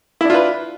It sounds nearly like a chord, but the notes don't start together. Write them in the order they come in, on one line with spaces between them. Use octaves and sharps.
E4 D4 F4 B4